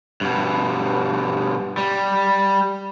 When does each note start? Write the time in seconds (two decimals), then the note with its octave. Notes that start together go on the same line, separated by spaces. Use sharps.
0.21 G2 B2
1.77 G3